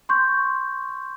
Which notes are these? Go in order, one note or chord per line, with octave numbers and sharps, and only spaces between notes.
C6 C#6 G6